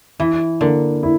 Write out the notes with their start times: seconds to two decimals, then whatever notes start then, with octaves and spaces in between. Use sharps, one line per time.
0.19 E3 E4
0.61 D3 A#3
1.03 E4